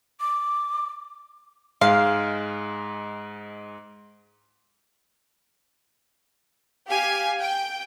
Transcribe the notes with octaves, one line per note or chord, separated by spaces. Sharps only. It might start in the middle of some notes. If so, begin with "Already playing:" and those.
D6
G#2 G#3 F5
G4 F5 G#5
G5